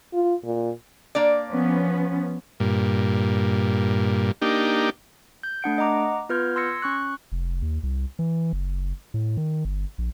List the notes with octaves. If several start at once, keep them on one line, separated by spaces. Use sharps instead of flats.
F4
A#2
A#3 D4 D5
F3 B3 C#4
G2 A#2
A#3 D4 D#4 G4
G6
A3 D4 F#5 D7
D#5 F#5 A#5 D6
B3 F4 B4 F6 G6 G#6
C6 E6 G#6 A#6 C#7
C#4 C#6 F#6
F1
D#2
C2
E3
F#1
A2
D#3
G1
A#1